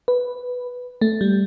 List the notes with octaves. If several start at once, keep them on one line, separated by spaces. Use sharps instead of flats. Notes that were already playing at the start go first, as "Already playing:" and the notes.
B4
A3
G3